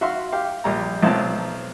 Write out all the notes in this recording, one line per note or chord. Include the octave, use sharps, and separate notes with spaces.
F#4 E5 F5 C6
G4 F5
A#1 G3 A#5
B1 F3 C4 F4 A5